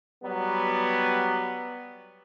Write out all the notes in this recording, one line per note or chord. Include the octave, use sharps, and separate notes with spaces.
F#3 G3 B3